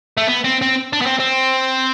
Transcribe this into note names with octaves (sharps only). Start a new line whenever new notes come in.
A3
B3
C4
C4
D4
B3
C4
C4